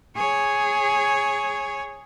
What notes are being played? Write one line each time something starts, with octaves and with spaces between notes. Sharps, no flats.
G#4 C#5